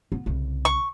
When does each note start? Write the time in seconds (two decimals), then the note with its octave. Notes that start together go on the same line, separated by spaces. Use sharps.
0.12 B3
0.26 C2 C#3
0.65 C#6